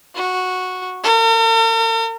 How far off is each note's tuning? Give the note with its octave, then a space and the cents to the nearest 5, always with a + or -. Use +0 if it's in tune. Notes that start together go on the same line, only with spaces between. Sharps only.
F#4 -10
A#4 -45